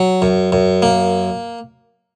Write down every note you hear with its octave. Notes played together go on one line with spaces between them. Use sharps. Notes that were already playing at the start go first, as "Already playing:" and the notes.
Already playing: F#3
F#2
F#2
A#3